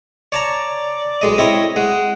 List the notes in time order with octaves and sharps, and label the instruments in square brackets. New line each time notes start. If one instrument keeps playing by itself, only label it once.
[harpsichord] C#5 A5 A#5 [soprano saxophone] D5
[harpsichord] B1 G#3 D#5
[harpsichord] C4 E4 C#5 [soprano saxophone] D#5
[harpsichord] G#3 [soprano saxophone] F#5